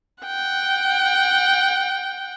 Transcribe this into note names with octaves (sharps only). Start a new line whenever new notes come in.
F#5 G5